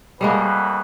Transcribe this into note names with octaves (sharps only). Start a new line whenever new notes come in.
F2 B2 G3 G#3 A#3 B4